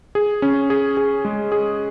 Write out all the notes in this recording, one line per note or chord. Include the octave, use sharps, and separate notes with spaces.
G#4
C#4
G#4
G#4
G#3
G#4